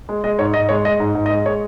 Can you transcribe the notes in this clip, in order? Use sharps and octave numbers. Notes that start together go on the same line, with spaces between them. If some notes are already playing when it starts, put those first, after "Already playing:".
G#3
G#3 D#5
G#2 C#5
G#2 D#5
G#3 C#5
G#3 D#5
G#2
G#2
D#5
G#3
G#3 C#5